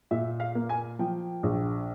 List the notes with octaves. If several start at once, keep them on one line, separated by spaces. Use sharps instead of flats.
A#2 E5
F5
A#3
G#5
F3 G5
A#1